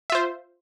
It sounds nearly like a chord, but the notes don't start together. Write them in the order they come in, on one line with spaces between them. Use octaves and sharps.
E5 F4 C5